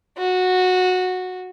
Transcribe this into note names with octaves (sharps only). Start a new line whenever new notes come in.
F#4